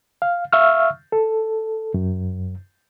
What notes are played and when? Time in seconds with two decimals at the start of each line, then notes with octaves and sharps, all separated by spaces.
0.22 F5
0.53 E5 F5 C#6 E6 F6
1.12 A4
1.94 F#2